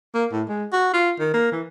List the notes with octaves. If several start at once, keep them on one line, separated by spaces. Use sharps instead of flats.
A#3
A2
G#3
F#4
F4
D#3
A#3
E3